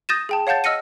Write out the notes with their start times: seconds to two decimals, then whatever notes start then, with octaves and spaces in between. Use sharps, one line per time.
0.09 D#6 G6 A6 A#6 D#7 E7
0.29 G#4 G5 A5
0.47 C#5 F5 F#5 A5 G6 A6
0.64 D#5 E6 F6 A#6 C#7 D#7